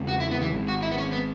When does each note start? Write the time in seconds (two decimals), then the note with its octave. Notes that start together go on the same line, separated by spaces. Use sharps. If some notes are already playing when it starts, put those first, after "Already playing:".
Already playing: E2 C#3 G#3
0.08 F#4
0.20 E4
0.31 B3
0.42 E3
0.53 G#1 G#2 G#3
0.68 F#4
0.82 E4
0.92 B3
0.98 C#4
1.12 B3